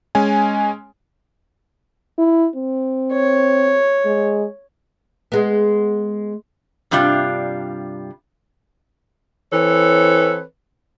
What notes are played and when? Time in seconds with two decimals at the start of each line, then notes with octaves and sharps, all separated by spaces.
0.15 G#3 C#4 G#5
2.18 E4
2.56 C4
3.12 C#5
4.06 G#3
5.32 G#3 B3
6.91 G2 C3 G3 D4 F4
9.53 E3 C4 A4 B4 C#5